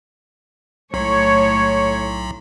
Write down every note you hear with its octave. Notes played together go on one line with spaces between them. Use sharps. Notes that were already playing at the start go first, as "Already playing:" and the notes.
B1 A2 C#5